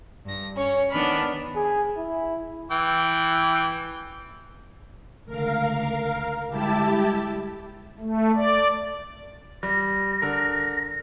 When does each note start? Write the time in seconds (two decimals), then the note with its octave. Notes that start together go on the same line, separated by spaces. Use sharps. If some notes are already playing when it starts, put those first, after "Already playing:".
0.24 G2 A#6
0.57 C#4 C#5
0.90 D#3 B3 D4 B5 F6
1.56 G#4
1.98 E4
2.71 E3 G5
5.26 C#2 D3 A3 A#4 F5
6.49 D3 G3 G#3 E4 G4 A5
8.00 A3
8.35 D5
9.63 G3 A#6
10.22 D3 A#4